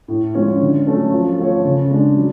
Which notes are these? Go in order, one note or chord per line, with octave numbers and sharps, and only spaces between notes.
A2
F3 G#3 C#4
D3
F#3 A3 C#4
F3
A3 F4 A4 C#5
C#3
G#3 D4
F#3